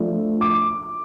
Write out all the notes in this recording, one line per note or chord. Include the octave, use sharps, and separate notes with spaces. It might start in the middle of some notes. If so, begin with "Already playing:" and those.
Already playing: F3 A3 D4
D6